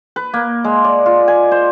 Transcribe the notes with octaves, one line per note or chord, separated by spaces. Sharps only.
B4
A#3
G#3
D5
F4
G#5
C5